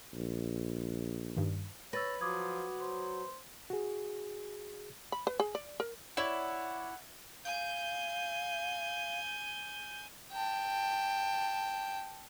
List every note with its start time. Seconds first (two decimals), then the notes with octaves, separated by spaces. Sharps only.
0.13 A#1
1.36 G2 D#3
1.93 B4 C#5 E6 A6 A#6
2.21 F3 F#3 D6 D#6 G#6
2.81 C5
3.70 F#4 G#4
5.12 B5
5.27 B4
5.40 G#4
5.55 D5
5.80 A#4
6.17 E4 C#5 D5 F#5
7.45 F5 G#5 G6
10.32 G5 A5